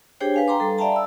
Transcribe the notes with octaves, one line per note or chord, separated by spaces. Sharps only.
D4 G4 G#4 C5 C#5 G5
B4 F5 G#5
G5 A#5 C6 D6
G3 A4
D5 E5 F5 G5 A5 A#5
B5 E6